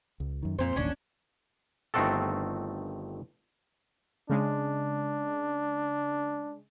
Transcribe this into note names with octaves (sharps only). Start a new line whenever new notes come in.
C#2
F#2 D#3
F2 A#2 C4 C5
D#1 A1 D#2 C#4 D4
G1 D#3 A3 C4 F#4 A4
C#3 G#3 D4